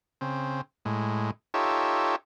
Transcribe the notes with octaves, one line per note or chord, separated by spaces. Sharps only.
C#3 C4
A2 G#3
D#4 F4 G4 A4 C#5 E5